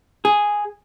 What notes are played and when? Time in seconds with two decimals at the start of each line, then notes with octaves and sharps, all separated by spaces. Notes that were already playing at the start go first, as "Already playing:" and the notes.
0.25 G#4